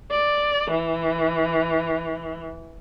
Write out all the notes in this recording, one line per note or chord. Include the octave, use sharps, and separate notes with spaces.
D5
E3